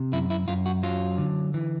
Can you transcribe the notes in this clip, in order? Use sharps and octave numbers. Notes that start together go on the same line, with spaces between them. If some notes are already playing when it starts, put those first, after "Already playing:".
Already playing: C3
F#2 E4
E4
F#2 F4
F#4
F#3 F4
D3
E3